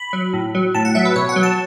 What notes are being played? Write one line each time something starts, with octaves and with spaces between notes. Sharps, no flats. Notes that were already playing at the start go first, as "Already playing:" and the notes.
Already playing: B5
F#3
A2
F#3
A2 A5
F#5
F#3 E5
B4
B2 C#5
F#5
F#3
A5